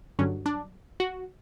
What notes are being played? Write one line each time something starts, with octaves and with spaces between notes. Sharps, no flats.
G2 D3 F#3 C#4
D4
F#4